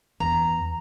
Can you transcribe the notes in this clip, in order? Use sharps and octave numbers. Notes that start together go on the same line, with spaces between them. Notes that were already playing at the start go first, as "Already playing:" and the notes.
E2 A#5